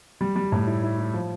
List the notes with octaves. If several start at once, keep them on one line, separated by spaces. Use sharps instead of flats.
G3
G3
A2
E4
E4
E4
F3